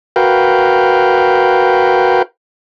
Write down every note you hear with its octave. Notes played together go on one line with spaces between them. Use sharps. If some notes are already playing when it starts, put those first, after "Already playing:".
F#4 A#4 B4 F5 G5